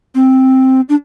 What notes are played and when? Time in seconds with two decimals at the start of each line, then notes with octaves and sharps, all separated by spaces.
0.15 C4
0.89 D4